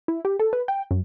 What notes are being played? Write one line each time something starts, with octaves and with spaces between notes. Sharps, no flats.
E4
G4
A4
B4
G5
F#2